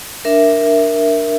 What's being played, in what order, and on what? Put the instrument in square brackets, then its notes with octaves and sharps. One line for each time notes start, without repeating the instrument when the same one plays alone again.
[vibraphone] D4 A#4 E5